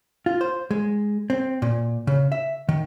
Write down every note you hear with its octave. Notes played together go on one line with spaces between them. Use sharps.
F4
C5
G#3
C4
A#2
C#3
E5
D#3